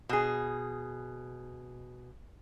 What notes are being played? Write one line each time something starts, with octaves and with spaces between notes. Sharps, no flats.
B2 G#4